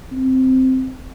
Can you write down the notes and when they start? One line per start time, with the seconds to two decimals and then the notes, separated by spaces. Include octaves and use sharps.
0.12 C4